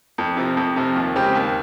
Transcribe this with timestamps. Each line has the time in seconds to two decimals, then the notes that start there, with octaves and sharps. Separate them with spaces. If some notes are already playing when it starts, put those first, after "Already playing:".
0.18 F2
0.37 C3 F3
0.57 F2
0.76 C3 F3
0.96 D#2
1.16 C#3 G#3 C4 G4
1.35 D#2